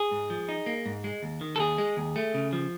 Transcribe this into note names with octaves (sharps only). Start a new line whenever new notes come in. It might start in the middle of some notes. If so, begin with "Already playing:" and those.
Already playing: G#4
G#2
F3
D#4
A#3
G#2
G#3
D#2
D#3
A4
D#2 G#4
G#3
D#2
A3
C#3
F3